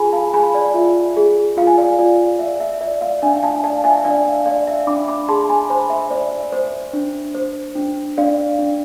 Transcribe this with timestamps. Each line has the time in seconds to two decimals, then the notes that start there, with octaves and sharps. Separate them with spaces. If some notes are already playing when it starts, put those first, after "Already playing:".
Already playing: F4 G#4 G#5 B5
0.13 F5 A5
0.33 G#4 G#5 B5
0.54 D5
0.74 F4 E5
1.16 G#4
1.57 F4 F5
1.67 G#5
1.77 D5 F5
1.99 F4 D5
2.39 D5 E5
2.60 E5
2.81 D5 E5
3.01 D5 F5
3.22 D4 E5 G#5
3.43 F5 A5
3.63 D5 F5 A5
3.84 E5 G#5
4.04 D4 D5 F5
4.25 E5
4.46 D5 F5
4.67 E5
4.87 D4 B5 D6
5.08 B5 D6
5.29 G#4 A5 C6
5.49 G#5 B5
5.70 C5 G#5 B5
5.90 E5
6.11 C5 D5
6.31 E5
6.52 C5
6.93 D4
7.35 C5
7.76 D4
8.18 D4 D5 F5
8.59 D4